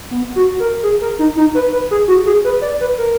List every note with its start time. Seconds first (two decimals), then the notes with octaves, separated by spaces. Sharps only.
0.11 B3
0.36 F#4
0.60 A#4
0.83 G#4
1.01 A#4
1.19 D#4
1.37 D#4
1.55 B4
1.73 B4
1.91 G#4
2.08 F#4
2.26 G#4
2.44 B4
2.61 D5
2.81 B4
2.98 A#4